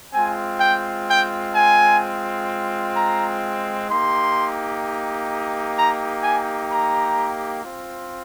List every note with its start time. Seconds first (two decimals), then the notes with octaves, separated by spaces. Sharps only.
0.13 G#3 C4 F4 G#5
0.59 G5
1.07 G5
1.53 G#5
2.95 A#5
3.88 A#3 D#4 G4 C6
5.77 A#5
6.23 G#5
6.70 A#5
7.63 C4 F4